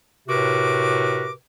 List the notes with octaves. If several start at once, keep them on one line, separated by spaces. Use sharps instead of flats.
A2 C3 F#4 A#4 B4 D6